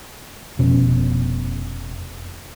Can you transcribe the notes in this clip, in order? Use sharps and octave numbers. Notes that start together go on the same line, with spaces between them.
F1 B2 B3 C#4